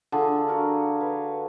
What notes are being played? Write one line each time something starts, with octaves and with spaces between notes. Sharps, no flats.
D3 F4 G#4
F4 F#4 A#4
B4 C#5